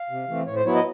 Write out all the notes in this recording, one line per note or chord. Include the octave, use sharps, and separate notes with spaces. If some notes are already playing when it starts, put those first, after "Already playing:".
Already playing: F5
C3
E3 A3 C4
A2 C#5
C5
F#3 B3 E4 C#5
D#5